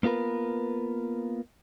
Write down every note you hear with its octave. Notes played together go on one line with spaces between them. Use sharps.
A#3 B3 F4 A#4 B4